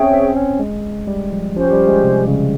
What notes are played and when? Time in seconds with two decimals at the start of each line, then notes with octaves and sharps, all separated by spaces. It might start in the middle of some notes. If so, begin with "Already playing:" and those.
Already playing: C4 C#4 G#4 C#5 E5 G5
0.13 C4
0.37 C#4
0.59 G#3
1.07 G3
1.32 F3
1.56 F3 C#4 G4 C5
1.72 G3
1.88 G#3
2.03 C3
2.27 C#3